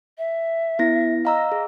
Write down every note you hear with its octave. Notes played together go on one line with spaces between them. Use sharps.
E5
B3 E4 A#6
D#5 F5 A#5 E6
G#4